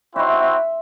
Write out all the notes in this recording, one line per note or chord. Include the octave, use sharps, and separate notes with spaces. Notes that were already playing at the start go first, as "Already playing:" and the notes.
C4 E4 F#4 E5 C6